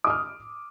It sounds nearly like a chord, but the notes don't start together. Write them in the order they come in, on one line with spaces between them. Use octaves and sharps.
D6 D#6 F6